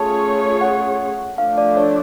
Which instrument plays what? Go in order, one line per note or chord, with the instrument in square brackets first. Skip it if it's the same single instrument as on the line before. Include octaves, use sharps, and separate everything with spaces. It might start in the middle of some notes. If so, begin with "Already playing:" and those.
Already playing: [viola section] A3 C#4 F4 G#4 C#5 [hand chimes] A5
[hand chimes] F#5
[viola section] F3 A3 D4 [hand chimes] F5
[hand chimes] D5
C#5